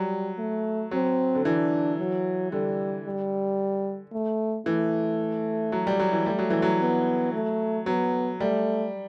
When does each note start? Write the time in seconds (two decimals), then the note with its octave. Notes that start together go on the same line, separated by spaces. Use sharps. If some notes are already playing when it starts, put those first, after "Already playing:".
Already playing: F#3 G3
0.38 A3
0.91 F#3 C4
1.35 D3
1.45 E3 D4
1.99 F#3
2.52 D3 G3
3.06 G3
4.13 A3
4.66 E3 A3
5.72 F#3
5.87 G3
5.99 F#3
6.12 E3
6.26 G3 A3
6.38 F#3
6.50 E3
6.62 F#3
6.80 B3
7.33 A3
7.86 F#3 B3
8.40 G3 A3